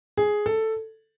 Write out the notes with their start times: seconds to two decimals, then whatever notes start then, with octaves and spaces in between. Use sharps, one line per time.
0.17 G#4
0.46 A4